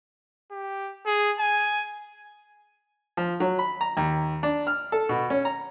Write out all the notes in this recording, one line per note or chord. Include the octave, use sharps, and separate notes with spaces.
G4
G#4
G#5
F3
F#3
B5
A#5
D#2
D4
F6
A4
B2
C#4
A#5